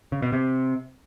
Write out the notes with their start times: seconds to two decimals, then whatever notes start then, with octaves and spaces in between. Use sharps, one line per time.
0.12 C#3
0.22 B2
0.33 C3